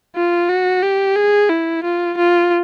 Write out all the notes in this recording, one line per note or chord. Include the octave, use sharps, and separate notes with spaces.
F4
F#4
G4
G#4
E4
F4
F4